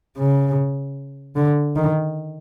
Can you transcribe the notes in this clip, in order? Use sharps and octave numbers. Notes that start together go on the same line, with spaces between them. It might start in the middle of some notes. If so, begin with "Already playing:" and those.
C#3
D3
D#3